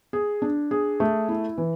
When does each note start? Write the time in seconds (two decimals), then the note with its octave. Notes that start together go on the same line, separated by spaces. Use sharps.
0.13 G#4
0.42 D4
0.71 G#4
1.00 A3
1.29 E4
1.58 E3